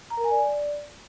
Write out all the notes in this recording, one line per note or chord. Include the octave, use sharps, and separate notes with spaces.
A#5
A#4
G#5
D5